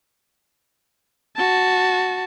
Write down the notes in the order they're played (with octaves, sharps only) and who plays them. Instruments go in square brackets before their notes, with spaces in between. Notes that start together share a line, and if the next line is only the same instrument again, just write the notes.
[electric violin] F#4 A5